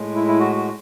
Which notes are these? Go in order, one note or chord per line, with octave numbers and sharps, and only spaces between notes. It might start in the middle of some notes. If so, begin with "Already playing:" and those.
Already playing: A2 G#3
E4
E4
F#4
F#4